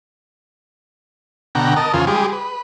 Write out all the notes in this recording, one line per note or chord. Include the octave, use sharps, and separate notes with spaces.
B2 D3 F#5 G5 A#5
A#4 D#5 A5
E2 C#3 F3 F4 G#5
G3 G#3 G4 G#4
B4